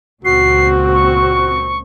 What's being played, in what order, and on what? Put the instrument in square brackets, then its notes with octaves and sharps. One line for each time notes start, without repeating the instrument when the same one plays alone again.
[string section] C#2 A#2 C4 [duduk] F#4 [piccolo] C7
[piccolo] C#6